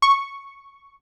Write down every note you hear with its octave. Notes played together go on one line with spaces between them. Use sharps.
C#6